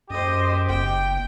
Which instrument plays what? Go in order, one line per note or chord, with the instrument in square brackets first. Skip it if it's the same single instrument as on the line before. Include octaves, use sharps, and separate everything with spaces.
[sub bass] F#2 [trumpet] G4 [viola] C5 D#5
[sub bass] F#1 [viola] G5